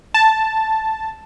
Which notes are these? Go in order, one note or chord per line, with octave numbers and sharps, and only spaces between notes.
A5